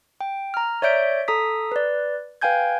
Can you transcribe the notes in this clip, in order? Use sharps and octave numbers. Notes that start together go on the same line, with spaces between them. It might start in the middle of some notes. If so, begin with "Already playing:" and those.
G5
A#5 F6
C#5 D5 E5 G6 D7
A4 A#5 D#6 B6
B4 D5
B4 F5 G5 G#5 G6 G#6